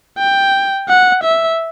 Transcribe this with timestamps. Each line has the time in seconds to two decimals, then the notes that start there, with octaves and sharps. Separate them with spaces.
0.18 G5
0.88 F#5
1.24 E5